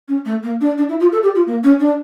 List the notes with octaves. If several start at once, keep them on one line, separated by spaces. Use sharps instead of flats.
C#4
A3
A#3
D4
D4
E4
F4
A4
G4
F4
A#3
C#4
D4